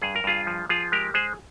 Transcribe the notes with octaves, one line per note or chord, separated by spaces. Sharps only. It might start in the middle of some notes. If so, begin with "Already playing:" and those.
G2 G#4
A#4
G2 F4 G#4
F3
F3 F4 G#4
G#3 G4 A#4
G#3 G#4 C5